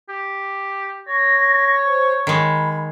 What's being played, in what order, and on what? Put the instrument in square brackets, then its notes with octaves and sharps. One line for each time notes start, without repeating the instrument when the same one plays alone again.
[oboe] G4
[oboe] C#5 [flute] A#6
[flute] C5
[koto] D#3 G#3 [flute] B5